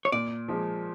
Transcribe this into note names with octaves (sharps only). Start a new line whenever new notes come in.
C#5
A#2 D5
F3 G#3